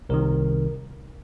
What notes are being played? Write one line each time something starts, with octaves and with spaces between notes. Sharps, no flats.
C2 C3 D#3 A#4